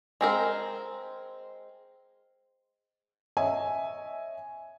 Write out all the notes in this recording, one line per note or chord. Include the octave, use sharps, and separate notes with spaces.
G#3 C4 A#4
C#5 D#5 E5 G#5